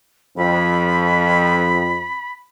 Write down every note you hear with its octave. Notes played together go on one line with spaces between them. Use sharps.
F2 B5